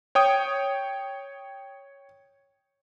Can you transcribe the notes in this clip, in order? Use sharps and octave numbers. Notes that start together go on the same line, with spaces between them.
C#5 G5 D#6